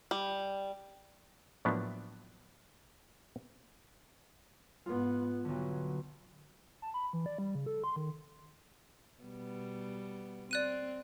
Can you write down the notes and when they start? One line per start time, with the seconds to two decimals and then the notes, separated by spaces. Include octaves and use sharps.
0.11 G3
1.65 A2 F3 F#3 A#3 B3 D4
4.86 G#2 B3 F4
5.45 B1 D3 F#3
6.82 A5
6.94 B5
7.13 E3
7.26 D5
7.38 G3
7.55 C#3
7.66 A4
7.84 C6
7.96 D#3
9.23 B2 G3 B3
10.51 C4 D5 F#6 D#7